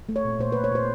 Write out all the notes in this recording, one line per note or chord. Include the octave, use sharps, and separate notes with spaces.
A3
C#5
A#2
A#2 C5
B4
A#2
C#5
A#2 C5